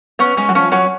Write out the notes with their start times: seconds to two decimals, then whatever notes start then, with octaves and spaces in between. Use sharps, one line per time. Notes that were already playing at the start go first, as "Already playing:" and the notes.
0.19 B3 C#4
0.37 G#3 C#4
0.49 F#3
0.55 F3 C#4
0.72 F#3 C#4